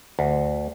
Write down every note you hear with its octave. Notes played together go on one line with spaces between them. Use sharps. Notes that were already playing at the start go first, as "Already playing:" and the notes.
D2